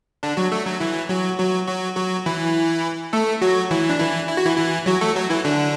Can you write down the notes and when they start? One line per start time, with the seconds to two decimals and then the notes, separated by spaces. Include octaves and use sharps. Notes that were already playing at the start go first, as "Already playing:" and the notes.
0.23 D3 D4
0.37 F#3 F#4
0.52 A3 A4
0.66 F#3 F#4
0.80 E3 E4
1.09 F#3 F#4
1.38 F#3 F#4
1.68 F#3 F#4
1.96 F#3 F#4
2.26 E3 E4
3.13 A3 A4
3.42 F#3 F#4
3.71 E3 E4
3.90 D4
3.99 E3 E4
4.28 E4
4.37 F#4
4.45 E3 E4
4.57 E3 E4
4.86 F#3 F#4
5.01 A3 A4
5.15 F#3 F#4
5.30 E3 E4
5.45 D3 D4